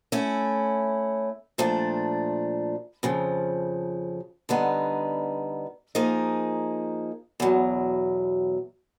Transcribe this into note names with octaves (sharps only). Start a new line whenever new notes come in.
A3 C#4 E4
A#2 F3 A3 D4
F2 C#3 F3
D3 G3 B3 D#4
F3 A#3 D#4 G#4
E2 B2 F#3